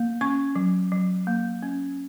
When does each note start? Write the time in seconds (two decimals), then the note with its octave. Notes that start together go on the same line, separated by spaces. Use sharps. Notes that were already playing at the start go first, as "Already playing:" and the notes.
Already playing: A#3
0.21 C#4 C#6
0.56 F#3
0.92 F#3
1.27 A#3
1.62 C#4